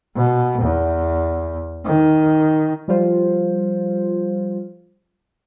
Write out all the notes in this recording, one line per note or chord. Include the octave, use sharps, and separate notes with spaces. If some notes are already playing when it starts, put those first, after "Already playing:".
B2
E2
D#3
F3 G3 F4 C5